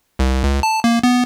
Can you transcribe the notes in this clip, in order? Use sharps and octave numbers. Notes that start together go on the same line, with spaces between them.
C2
C#2
A5
A#3
B3